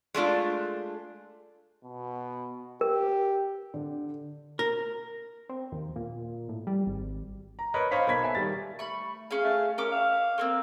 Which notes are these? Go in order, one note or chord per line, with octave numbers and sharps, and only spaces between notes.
G#3 A3 D4 F4
B2
G4 A#4
D3
A#4
C4
D#2
A#2
A2
G3
G#1
A#5
A#4 B4 C#5 D#5 B5
C5 C#5 D#5 F5 B5 B6
B1 A#3 B5 G#6 B6
A4 B4 E5 G#5
D#3 G3 A6
A3 B5 C#6
C#4 G#4 F5
A3
C#4 A#4 D6
F5
A3 A#3 C4